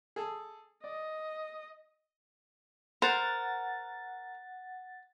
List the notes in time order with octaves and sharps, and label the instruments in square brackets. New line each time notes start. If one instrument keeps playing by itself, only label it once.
[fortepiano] G#4 A4
[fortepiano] D5 [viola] D#5
[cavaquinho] A#4 [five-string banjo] C5 [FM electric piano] F#5 A6